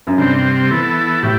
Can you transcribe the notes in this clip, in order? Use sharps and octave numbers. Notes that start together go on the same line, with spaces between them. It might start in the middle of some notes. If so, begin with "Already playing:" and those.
F#2
G2 C3 G3 C4
E3 B3 E4 A4
A2 E4 G4